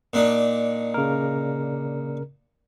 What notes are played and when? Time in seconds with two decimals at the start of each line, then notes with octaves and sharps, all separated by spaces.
0.13 A#2 D4 D#4
0.94 C#3 A#4